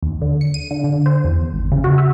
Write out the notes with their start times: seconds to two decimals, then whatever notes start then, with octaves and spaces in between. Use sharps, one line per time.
0.03 D#2
0.21 D3
0.41 C#7
0.54 D#7
0.71 D3
0.84 D3
1.06 C5
1.24 E2
1.53 G#1
1.72 C#3
1.84 F#4
1.98 E5